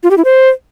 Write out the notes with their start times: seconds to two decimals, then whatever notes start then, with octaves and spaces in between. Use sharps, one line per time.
0.03 F4
0.10 G4
0.18 E4
0.25 C5